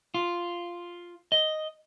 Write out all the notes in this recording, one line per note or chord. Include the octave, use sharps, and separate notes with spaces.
F4
D#5